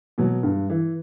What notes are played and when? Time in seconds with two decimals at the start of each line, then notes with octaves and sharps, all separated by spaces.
0.18 B2 F#3
0.43 G2
0.70 E3